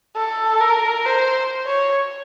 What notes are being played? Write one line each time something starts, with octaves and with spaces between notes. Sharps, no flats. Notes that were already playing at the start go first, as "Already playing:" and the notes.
A4
A#4
C5
C#5